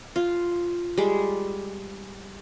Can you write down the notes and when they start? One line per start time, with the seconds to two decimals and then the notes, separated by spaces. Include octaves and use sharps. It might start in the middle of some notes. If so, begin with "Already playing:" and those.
0.16 F4
0.98 G3 G#3